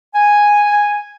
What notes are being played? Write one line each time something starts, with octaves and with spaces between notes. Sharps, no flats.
G#5